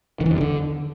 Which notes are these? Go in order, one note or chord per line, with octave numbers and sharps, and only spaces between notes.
D#3
E3
F2
G2
D3